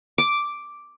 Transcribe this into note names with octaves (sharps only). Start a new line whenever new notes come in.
D6